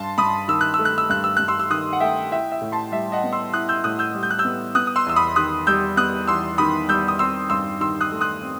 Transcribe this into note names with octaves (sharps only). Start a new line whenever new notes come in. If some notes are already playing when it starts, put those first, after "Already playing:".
Already playing: G2 A5 C6
G2 B5 D#6
D#3 E6
F#6
A3 E6
F#6
E6
G2 F#6
E6
G2 F#6
C6 E6
E6
D#3 D#6 F#6
F#5
A3 E5 G5
E4 E5 G5
E5
A2
A5 C6
G3 E5
D#5 F#5
B3
C6 E6
E4 D#6 F#6
E6 G6
A2 D#6 F#6
E6 G6
G3
G6
F#6
E6 G6
B3
B3 D#6 F#6
D#6
C6 E6
E2 E6
B5 D#6
D#3 D#6 F#6
G3 E6 G6
B3 D#6 F#6
E2 C6 E6
D#3 B5 D#6
G3 E6 G6
D#6
C4 C6 E6
G2 C6 E6
D#3 C6 E6
D#6 F#6
A3
D#6 F#6
C4